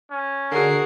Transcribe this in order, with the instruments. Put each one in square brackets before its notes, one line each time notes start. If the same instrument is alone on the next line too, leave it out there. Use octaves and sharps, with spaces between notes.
[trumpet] C#4
[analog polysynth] D3 [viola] F#4 G#4 [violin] A#4 C7